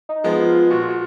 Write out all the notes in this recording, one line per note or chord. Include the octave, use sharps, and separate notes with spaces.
D#4
F3 G#3 B3
F4
A#2 F#4
F#4